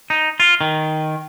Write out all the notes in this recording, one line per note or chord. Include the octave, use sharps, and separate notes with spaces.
D#4
F4
D#3